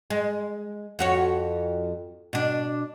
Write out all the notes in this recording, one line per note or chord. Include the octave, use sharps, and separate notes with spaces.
G#3
F2 F#4 C#5
B2 D4